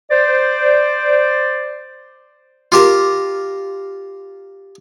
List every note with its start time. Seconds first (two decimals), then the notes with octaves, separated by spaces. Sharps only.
0.11 C5 D5
2.72 F4 G4 A#4